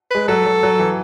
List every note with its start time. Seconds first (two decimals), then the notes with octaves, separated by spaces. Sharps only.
0.11 G#3 B4
0.28 F#3 A4
0.46 F#3
0.63 F#3
0.79 E3